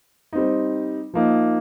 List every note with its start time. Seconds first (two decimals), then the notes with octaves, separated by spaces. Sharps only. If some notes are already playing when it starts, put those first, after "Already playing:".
0.33 G3 C4 D#4
1.14 F3 A#3 D#4